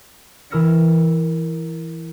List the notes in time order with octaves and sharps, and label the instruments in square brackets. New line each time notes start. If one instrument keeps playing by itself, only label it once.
[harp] E3 A#4 E6 F6 A#6 C#7